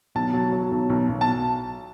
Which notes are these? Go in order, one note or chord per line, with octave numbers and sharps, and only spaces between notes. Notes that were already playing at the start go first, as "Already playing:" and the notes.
B1 A5
F#3
F#3
B1
B1
B1
A5